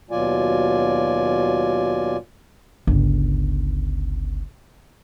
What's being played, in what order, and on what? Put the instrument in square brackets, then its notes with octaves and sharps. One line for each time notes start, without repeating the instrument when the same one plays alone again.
[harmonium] D#2 B2 F#3 F4 D5 G#5
[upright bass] G1 C#2